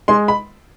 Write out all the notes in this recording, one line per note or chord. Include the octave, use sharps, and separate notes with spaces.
G#3 C6
B5